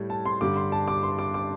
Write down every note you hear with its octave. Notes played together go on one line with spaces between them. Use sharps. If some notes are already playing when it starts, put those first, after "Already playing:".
Already playing: A2 G3
A5
C6
G2 D3 G3 D6
C6
A5
D6
C6
D6
D6